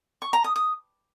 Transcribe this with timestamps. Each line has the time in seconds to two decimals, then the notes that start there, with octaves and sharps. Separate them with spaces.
0.22 C#6
0.33 A#5
0.44 D#6
0.56 D#6